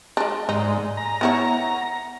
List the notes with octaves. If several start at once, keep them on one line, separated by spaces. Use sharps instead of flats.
G#3 D4 C6
G#2 D#4 D5
G#5 A#5
B3 E4 C#5 F#5